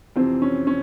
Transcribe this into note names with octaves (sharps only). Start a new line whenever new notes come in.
F2 C3 E3 C4
C#4
C#4